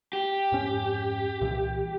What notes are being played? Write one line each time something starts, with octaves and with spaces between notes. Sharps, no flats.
G4
F2 G#2 C#4
C2 A#2 E3